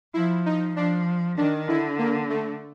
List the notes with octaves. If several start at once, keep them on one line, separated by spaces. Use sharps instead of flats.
F3 E4
D#4
F3 D4
D#3 D4
D3 E4
A#3
A3